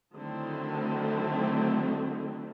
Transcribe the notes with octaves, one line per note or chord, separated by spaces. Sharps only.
D3 D#3 F#3 A3 C4 E4